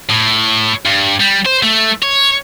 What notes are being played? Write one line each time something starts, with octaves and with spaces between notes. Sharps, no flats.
A2
G2
G3
C5
A3
C#5